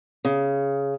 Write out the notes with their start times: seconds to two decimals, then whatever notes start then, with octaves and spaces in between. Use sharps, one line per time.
0.25 C#3